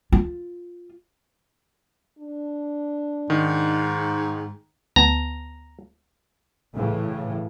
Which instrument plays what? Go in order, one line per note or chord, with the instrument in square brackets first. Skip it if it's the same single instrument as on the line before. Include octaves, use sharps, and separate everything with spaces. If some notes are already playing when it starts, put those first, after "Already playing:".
[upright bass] F4
[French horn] D4
[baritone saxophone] G#2 [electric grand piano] D#3
[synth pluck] D2 B3 A5 [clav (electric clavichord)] A#5
[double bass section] A2 C#3 E3